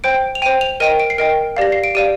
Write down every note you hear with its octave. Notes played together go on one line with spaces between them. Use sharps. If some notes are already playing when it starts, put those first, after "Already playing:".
C5 G5 D7
F7
C5 G5 D#7
F7
A#4 D#5 G5 D#7
D7
C7
A#4 D#5 G5 D7
G4 D5 F5 A#6
C7
D7
G4 D5 F5 D#7